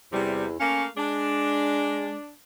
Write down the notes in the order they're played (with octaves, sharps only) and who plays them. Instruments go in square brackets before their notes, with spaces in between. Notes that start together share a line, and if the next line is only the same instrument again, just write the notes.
[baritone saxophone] E2 [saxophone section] C3 G3
[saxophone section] A3 A#3 F5 [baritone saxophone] C#4
[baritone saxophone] G#3 [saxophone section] D4